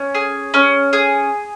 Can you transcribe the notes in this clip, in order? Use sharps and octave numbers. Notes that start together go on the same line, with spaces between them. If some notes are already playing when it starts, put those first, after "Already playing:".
Already playing: C#4
G#4
C#4
G#4